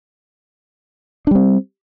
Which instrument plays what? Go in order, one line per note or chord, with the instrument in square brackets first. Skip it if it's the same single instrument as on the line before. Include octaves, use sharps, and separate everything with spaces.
[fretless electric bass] D4
G3
C4